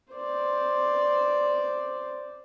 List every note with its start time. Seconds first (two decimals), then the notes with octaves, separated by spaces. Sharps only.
0.13 C5 D5